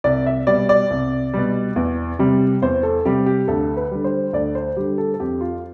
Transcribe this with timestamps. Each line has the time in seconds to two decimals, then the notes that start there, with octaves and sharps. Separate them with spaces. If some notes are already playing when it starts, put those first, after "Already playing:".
0.04 C2 D5
0.26 E5
0.47 B2 G3 D5
0.69 D5
0.91 C2
1.34 B2 G3
1.76 E2
2.19 C3 G3
2.62 E2 C5
2.83 A4
3.05 C3 G3 G4
3.26 G4
3.48 D2 A4
3.77 B4
3.91 D3 G3
4.04 C5
4.33 D2 D5
4.55 C5
4.77 D3 G3 G4
4.98 A4
5.14 A4
5.20 F2 G4
5.41 F4